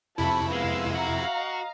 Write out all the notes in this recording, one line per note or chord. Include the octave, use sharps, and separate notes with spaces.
F2 C3 E4 A5 B5 C#6
G#3 B3 F5 E6
F#4 E5 F5 A#5
D#5